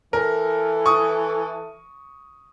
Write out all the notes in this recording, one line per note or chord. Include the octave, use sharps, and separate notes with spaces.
E3 A4 A#4
C#6 D#6